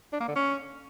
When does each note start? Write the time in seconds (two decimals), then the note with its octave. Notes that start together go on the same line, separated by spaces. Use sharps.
0.13 D4
0.21 A#3
0.28 D3
0.36 C#4